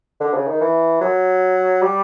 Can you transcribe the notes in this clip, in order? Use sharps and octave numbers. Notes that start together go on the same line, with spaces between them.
D3
C#3
D#3
E3
F#3
G3